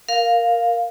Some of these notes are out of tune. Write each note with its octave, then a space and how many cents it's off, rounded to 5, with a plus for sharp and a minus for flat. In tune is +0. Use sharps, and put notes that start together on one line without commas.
A#4 +0 F5 +5